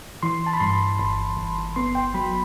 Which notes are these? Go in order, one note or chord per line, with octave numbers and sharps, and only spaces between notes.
E3 C6
A5
B5
G2 C6
G1
G1
B3 C6
G5
F#3 B5